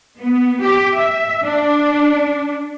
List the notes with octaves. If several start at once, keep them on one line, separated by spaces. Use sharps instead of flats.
B3
G4
E5
D4